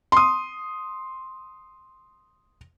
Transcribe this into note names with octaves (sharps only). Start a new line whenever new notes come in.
C6 D#6